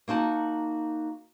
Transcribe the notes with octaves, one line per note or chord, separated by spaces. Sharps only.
A#3 D#4 F#4 A5